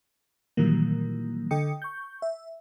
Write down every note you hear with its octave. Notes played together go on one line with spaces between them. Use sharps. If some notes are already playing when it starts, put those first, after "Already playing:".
A#2 D#3 E3 F#3 G3 A#3
D3 A4 D#5 G5 D#6 C#7
C#6 G6
E5